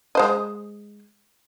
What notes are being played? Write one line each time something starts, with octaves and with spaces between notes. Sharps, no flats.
G#3 C5 D#5